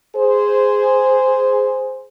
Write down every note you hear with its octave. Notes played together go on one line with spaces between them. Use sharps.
G#4 C5